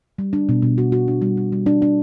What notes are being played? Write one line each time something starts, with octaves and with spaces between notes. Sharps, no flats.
G3
D4
B2
B2
F#4
F#4
D4
G3
G3
G3
D4
D4